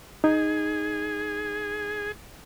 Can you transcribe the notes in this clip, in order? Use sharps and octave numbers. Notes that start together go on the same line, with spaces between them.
D#4 G#4